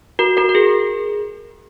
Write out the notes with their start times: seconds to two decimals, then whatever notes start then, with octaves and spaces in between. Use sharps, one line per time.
0.19 F#4 A#4
0.37 F#4 A#4
0.49 A#4
0.55 G#4